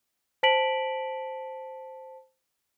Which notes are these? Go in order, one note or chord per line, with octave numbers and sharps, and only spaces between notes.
C5 A5 B6 D7 F#7